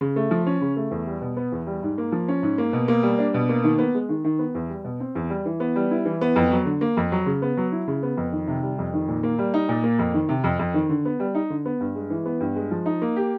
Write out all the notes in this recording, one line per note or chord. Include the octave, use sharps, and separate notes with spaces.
C#3
A3
F3
C#4
C#3
A3
E2
G3
B2
B3
E2
G3
G#2
A#3
F3
C#4
G#2
A#3
B2
A#3
G3
D4
B2
A#3
D#3
B3
G#3
D#3
D#3
B3
E2
G3
B2
C4
E2
G3
E3
B3
G3
E4
E3
B3
F2
F#3
D3
A#3
F2
F#3
C#3
B3
F#3
E4
C#3
B3
F2
D#3
C3
G3
F2
D#3
A#2
A#3
G3
D#4
A#2
A#3
F2
D#3
C3
F2
F2
D#3
D3
B3
G3
D#4
D3
B3
G2
G#3
E3
B3
G2
G#3
F3
D#4
A#3
G4